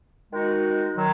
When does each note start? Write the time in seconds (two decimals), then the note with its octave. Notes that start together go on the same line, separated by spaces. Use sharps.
0.32 D#3 G#3 D#4 F#4
0.97 D#3 F#3